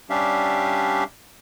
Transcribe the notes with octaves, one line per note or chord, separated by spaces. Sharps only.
G3 C#4 D4 G4 E5 F5